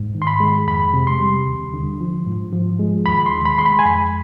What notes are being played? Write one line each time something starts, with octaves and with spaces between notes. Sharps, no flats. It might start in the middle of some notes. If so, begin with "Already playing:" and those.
Already playing: G#2
D#3
C6
B5
G#3
F2 B5
C3
C6
G3
D#2
D3
F3
G#2
F3
G#3
D#2 B5
C6
D#3
B5
G#3 C6
B5
G#5
F2 B5